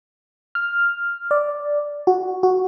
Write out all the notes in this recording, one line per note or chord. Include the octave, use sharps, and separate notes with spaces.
F6
D5
F#4
F#4